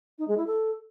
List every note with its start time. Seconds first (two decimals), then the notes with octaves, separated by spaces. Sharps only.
0.19 D#4
0.28 G#3
0.37 E4
0.47 A4